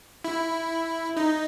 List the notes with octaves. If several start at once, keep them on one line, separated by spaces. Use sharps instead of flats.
E4
D#4